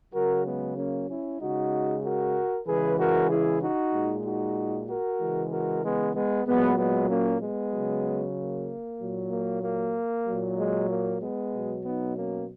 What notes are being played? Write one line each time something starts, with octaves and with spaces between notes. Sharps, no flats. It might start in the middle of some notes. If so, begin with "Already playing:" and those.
C#3 F#3 F#4 A#4
G#3 B3
A#3 C#4
C#4 E4
C#3 G#3 D#4 F#4
F#4 A#4
C#3 E3 G#3 G#4 B4
F#4 A#4
E4 G#4
D#4 F#4
A#2 G#3
D#4 F#4
F#4 A#4
C#3 E3 G#3
F#4 A#4
G#3 B3
G#3 B3
A#2 F#3 G#3 B3
G#3 B3
A#3 C#4
G#3 B3
C#3 F#3
A#3
A#2 F#3
A#3
A#3
A#2 F#3
G#3
A#3
G#3 B3
B2 F#3
B3 D#4
A#3 C#4